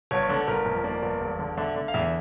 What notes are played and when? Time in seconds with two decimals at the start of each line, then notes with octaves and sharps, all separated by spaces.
0.11 G1 C#5
0.23 C#5
0.29 D3
0.35 A4
0.47 G1 A#4
0.66 F2
0.84 A#3 D5
1.02 G1
1.21 E1
1.39 D3
1.58 D3 E5
1.76 D3
1.88 F5
1.94 E2 E5